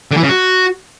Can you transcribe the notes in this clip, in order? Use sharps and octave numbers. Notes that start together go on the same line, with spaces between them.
D3
E3
C#3
F#4